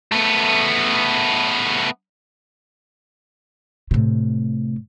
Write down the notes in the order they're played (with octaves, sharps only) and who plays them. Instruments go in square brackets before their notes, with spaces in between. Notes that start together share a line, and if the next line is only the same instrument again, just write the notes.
[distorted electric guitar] A3 B3
[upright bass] A2 C3